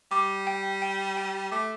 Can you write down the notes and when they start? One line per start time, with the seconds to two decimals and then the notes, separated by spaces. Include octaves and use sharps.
0.11 G3 D6
0.47 G5
0.82 G5
1.17 G5
1.52 A3 D6